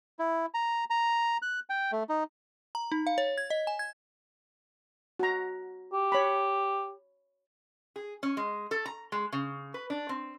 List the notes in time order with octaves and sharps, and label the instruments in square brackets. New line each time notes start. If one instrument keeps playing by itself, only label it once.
[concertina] E4
A#5
A#5
F#6
G5
A3
D#4
[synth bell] A#5
D#4
F5
C#5
G#6
D#5
G#5
G#6
[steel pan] F#4 A#5
[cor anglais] G4
[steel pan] C#5 B5
[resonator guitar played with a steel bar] G#4
C#4
G#3
A4
A#5
G#3
C#3
B4
D4
C4